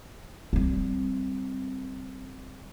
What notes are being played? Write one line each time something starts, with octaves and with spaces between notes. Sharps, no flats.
G3 C4